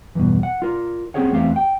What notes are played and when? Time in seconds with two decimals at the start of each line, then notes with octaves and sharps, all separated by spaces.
0.15 E2 G2 B2
0.43 F#5
0.62 F4 A#4
1.14 C4 D4 G4 G#4 C#5 F#5
1.32 E2 A3 C4 G4 F5
1.56 G5